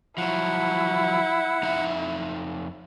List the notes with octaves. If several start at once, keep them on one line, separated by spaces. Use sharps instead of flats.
F3 F#3 E4 F#5
F2 D#4 E5